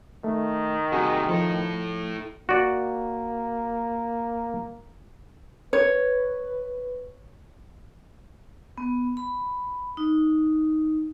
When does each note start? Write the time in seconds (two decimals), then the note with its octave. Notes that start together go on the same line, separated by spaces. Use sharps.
0.24 D#3 A3
0.92 G2 C3 F#4 G#4
1.29 F3 E4 A4
2.49 A#3 F#4 D5
5.73 B4 C#5
8.78 B3
9.17 B5
9.97 D#4